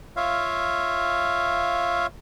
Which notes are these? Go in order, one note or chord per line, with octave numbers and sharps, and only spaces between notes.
F4 C#5 E5 F5